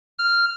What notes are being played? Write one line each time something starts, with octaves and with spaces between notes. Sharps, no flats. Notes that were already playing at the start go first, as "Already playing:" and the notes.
F6